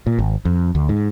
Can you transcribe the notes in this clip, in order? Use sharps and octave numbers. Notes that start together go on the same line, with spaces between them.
A#2
G#1
F2
D2
G#2